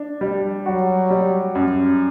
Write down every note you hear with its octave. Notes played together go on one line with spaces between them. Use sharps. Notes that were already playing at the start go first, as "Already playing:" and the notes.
Already playing: D4
G3
F#3 F#4
G3
F#2